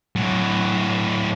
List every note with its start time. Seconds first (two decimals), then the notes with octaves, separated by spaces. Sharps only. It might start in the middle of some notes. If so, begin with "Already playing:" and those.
0.16 A2 F#3